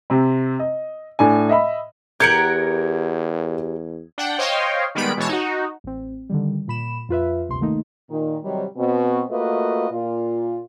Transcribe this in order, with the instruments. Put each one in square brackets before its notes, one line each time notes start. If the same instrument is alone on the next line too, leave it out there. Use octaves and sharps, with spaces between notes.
[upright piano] C3 C4
D#5
A2 D4 G#5
D#5 E5 B5
[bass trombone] E2 [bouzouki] G4 A#4 F#5 [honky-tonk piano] G#6 C#7 D7
[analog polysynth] D4 F#5 G5
C5 C#5 D#5 F5 G5 C6
D#3 G3 G#3 B3 B5 D7
B2 E3 G#3 C#5 A5
D#4 F#4
[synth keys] A1 C4
D3 D#3 G3
A#2 B5 E7
F2 F4 B4 E5
G1 D2 C3 C6
D#3 A3 A#3 D#4
[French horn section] A#2 D#3
G#2 C3 D#3 F#3 G3
B2 C4
A3 A#3 F4 F#4 B4 D#5
A#2 F4